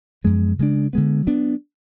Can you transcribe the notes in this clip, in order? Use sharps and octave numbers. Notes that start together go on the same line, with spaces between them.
F#2 F3 G#3 B3
C#3 G#3 D4
D3 G#3 B3
F#3 B3 D4